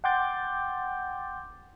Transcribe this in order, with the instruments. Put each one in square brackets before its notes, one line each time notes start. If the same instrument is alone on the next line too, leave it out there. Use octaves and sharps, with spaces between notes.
[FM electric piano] F#5 G5 C6 D6 G6 A6